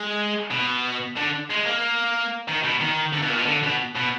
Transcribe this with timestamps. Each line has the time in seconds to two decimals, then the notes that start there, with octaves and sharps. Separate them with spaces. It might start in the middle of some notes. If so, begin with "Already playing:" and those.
Already playing: G#3
0.51 B2
1.16 D3
1.50 G#3
1.66 A#3
2.48 D#3
2.64 B2
2.81 D#3
3.13 D3
3.22 B2
3.29 A#2
3.38 B2
3.46 D3
3.63 B2
3.96 B2